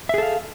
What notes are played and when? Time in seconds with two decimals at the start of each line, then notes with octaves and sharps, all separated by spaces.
0.09 E5
0.14 G#4
0.18 A4
0.23 F5